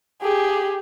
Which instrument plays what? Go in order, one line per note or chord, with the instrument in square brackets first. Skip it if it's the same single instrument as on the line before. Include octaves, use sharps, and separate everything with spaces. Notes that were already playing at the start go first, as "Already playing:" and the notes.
[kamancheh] G4 G#4